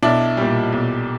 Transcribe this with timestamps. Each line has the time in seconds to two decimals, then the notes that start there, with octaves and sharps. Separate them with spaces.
0.03 B1 D4 E4
0.37 A#2 G3
0.72 B1